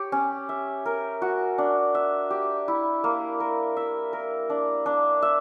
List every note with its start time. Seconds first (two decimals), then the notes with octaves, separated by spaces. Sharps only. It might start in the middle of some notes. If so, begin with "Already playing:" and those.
Already playing: G4 C#5
0.12 C#4
0.49 E5
0.86 A#4
1.22 F#4
1.58 D4
1.95 E5
2.30 G4
2.68 E4
3.04 A#3
3.40 A#4
3.77 E5
4.13 A#4
4.50 D4
4.86 D4
5.22 E5